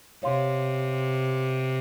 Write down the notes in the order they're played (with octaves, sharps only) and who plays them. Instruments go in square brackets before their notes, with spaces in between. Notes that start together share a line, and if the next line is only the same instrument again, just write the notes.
[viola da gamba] C3 [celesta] C#5 F5 C6